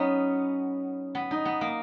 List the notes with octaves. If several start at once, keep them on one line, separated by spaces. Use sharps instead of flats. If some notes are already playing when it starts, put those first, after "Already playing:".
Already playing: F#3 B3 C#4 D#4
B3
D#4
B3
A#3